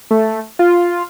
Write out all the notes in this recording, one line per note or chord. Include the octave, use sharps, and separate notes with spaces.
A3
F4